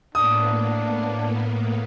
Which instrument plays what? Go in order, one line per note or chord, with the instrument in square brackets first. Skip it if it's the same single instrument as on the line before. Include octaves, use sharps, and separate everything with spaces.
[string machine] A2 A#3 B3 [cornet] D4 [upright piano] D#6